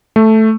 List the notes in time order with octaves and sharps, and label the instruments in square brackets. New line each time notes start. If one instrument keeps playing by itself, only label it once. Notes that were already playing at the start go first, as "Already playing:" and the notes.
[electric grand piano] A3